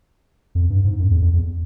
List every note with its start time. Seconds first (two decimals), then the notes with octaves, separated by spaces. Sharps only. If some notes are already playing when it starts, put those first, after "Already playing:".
0.55 F2
0.70 G2
0.84 G#2
0.99 F#2
1.11 E2
1.22 F2
1.33 E2